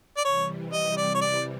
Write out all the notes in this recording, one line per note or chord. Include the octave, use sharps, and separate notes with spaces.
D5
C3 E3 G3 C#5
D#5
D5
C#5
D5